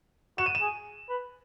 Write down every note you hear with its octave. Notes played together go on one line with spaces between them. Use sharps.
F#4 E7
D#7
E7
G#4
B4